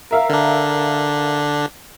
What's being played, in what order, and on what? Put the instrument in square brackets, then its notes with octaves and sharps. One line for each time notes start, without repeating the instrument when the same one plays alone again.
[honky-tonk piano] A#4 E5 F5
[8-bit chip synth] D3 D4